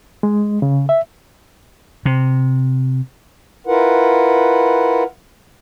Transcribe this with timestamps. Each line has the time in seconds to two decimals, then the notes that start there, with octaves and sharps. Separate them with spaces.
0.23 G#3
0.62 C#3
0.89 E5
2.05 C3
3.67 E4 F4 A#4 B4 F#5